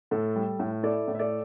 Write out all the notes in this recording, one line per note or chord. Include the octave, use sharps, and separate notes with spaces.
A2 A4
G3
A2
E4 A4 D5
A2
E5
A4 D5